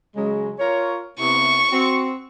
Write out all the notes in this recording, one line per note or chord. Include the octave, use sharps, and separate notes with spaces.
C#3 F#3 G#3
F4 A#4 C#5
C3 B3 E4 C#6
C4 F#4